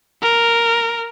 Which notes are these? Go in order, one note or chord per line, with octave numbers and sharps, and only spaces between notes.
A#4